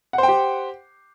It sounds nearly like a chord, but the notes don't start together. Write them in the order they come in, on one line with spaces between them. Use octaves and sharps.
F#5 C5 G5 G4